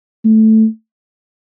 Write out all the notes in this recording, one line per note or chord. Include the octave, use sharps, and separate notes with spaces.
A3